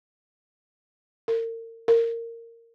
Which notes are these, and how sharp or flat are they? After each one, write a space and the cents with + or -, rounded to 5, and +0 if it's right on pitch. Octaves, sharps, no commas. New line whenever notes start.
A#4 -35
A#4 -15